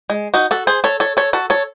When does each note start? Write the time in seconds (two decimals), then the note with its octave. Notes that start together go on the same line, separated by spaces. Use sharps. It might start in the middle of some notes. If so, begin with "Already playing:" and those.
0.10 G#3
0.34 D#4 F#4
0.51 F#4 A4
0.67 G#4 C5
0.84 A4 C#5
1.00 A4 C#5
1.17 A4 C#5
1.33 F#4 A4
1.50 A4 C#5